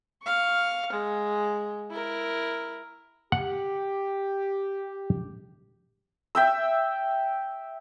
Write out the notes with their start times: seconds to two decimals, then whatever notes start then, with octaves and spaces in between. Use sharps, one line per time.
0.23 F5 C#6
0.92 G#3
1.90 E4 A#4
3.32 G4 F#5
6.35 E5 G5 E6